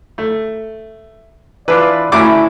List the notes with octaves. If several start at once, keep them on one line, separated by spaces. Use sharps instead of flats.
A3
E3 D4 F4 B4 D5
A1 D2 C#4 D4 E4 D6